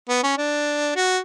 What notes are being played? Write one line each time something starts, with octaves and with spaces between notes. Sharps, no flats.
B3
C#4
D4
F#4